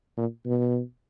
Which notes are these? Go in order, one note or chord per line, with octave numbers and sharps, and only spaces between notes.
A#2
B2